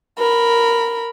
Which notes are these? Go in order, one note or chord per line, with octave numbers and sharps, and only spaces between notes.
A#4 B5